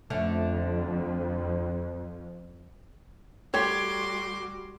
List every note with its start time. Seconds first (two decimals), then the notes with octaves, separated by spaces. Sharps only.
0.10 F2 D3 A3 C#4
3.54 G3 A3 F#4 G4 C#5 C6 D6 G#6